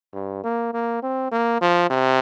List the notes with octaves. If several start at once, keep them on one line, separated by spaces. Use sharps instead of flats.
G2
A#3
A#3
C4
A#3
F3
C3